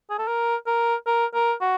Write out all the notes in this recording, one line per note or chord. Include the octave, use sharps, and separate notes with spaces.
G#4
A4
A#4
A#4
A#4
A#4
F#4